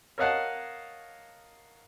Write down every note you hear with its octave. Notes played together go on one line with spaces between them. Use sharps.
A#4 C#5 D#5 F5 F#5 A5